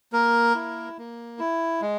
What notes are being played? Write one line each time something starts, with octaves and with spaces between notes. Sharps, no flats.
A#3 A#4
E4
A#3
E4
G#3